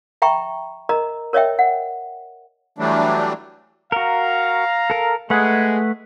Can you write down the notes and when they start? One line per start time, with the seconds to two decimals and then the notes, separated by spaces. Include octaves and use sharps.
0.22 E5 G5 A#5 B5 C#6
0.89 A#4 D#5 A#5
1.33 A#4 C#5 D#5 E5 G5
1.59 F#5
2.78 E3 F#3 G3 A3 D4
3.92 F#4 A#4 F5 A#5
4.90 A4 A#4
5.30 G#3 A3 G#4 B4 F#5